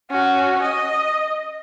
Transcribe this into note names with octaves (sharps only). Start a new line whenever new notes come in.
C#4 F#4
D#5